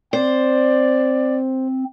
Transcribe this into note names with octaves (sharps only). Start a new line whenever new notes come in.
C4 C5 D5